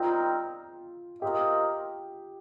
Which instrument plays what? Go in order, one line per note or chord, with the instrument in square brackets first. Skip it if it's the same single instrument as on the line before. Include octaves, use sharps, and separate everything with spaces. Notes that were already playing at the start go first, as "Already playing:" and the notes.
Already playing: [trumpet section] G3 C4 D#4 A#4 G5 [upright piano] F4
[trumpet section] C4 F4 A#4 D#5 [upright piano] G4